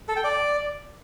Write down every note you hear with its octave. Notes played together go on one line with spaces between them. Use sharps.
A4
G5
D5